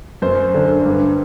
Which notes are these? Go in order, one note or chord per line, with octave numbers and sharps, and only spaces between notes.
F#2 C5
D3
G2